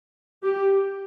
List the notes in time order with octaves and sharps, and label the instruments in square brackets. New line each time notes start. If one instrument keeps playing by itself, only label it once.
[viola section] G4